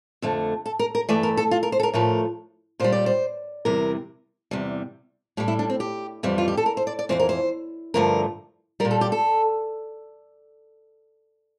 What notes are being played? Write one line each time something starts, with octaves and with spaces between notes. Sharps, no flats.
F2 D3 A3
A4
A#4
A#4
G2 E3 A3 D5
A#4
A4
F4
A#4
C5
A4
A#4
A2 F3 A3 A#4
A#2 G3 C5
D5
C5
E2 C3 E3 G3 A#4
E2 C3 G3
A2 G3 G4
E4
D4
C4
G4
F2 E3 G3
F4
G4
A4
A#4
C5
D5
D5
F2 C3 E3 C5
A#4
C5
G2 D3 F3 A3 A#4
A#2 G3 A#4
A4
G4
A4